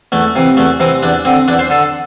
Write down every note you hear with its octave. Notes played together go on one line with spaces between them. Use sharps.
E2 A3
C3 E3
E2 A3
C3 E3 C4
E2 D4
D3 C4
E2 D4
C5
D3 A4